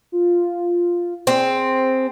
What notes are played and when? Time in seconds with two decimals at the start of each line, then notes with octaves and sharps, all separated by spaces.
0.12 F4
1.27 C4 G#4